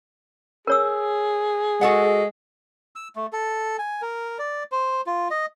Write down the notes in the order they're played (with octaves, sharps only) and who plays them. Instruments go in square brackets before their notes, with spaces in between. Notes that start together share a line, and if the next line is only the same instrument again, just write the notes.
[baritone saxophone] G#4 [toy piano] A#4 C#5 E6
[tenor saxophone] G#3 [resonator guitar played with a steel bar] F#4 A4 F#5
[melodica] E6
A3
A4
G#5
A#4
D5
C5
F4
D#5